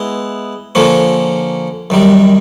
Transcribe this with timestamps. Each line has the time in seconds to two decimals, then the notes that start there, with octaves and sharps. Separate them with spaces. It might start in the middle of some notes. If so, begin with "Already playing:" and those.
Already playing: G#3 B3 E4
0.75 D3 F3 A#3 C#4
1.90 F#2 D#3 G3